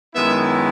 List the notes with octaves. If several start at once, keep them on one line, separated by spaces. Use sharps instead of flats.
F#2 D#3 G#3 B3 E4 E5